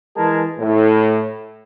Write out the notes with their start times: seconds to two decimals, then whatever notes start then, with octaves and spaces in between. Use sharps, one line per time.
0.17 E3 G#3 G#4 A#4 A5
0.58 A2